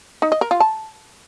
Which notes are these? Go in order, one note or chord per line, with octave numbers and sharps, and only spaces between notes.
D#4
D#5
A#4
F4
A5